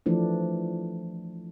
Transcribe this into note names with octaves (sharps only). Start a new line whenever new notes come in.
E3 F3 A3 D4